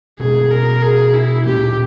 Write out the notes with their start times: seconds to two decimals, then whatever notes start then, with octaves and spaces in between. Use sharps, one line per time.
0.19 B2 G#3 C#4 G#4
0.51 A#4
0.82 G#4
1.14 E4
1.46 A#2 A#3 C#4 G4